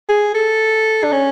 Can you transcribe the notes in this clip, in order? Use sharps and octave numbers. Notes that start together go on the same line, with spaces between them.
G#4
A4
D4
C#4